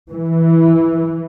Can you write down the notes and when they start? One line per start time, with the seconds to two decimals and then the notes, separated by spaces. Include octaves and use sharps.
0.11 E3